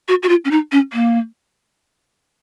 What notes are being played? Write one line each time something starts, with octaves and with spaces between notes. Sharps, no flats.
F#4
F#4
F4
C#4
D#4
C#4
A#3